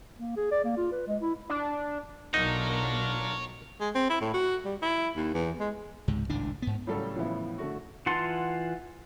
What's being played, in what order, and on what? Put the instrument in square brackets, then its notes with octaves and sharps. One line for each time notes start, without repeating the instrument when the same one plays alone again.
[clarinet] A#3
G#4
D5
A#3
F4
B4
G#3
E4
[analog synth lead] D4
[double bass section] B1 [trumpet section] D4 F4 A#4 [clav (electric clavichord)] D#4 [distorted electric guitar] C#5 F#5
[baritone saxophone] G#3
C4
E4
A2
F#4
G3
E4
D#2
E2
G#3
[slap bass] C#2 G#2 C3
G#1 C#2 A2 D4
G#2 B3
[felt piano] A2 C#3 F#3 G3 A4
A2 C#3 E3 F3 B3 E4
D3 A3 F#4
[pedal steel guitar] E3 F4 F#5 A5 C6